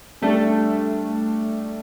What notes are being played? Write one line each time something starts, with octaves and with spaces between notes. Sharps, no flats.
G3 A3 D4 A4